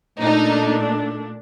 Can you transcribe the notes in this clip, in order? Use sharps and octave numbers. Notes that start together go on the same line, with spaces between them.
A#2 A3 D4 D#4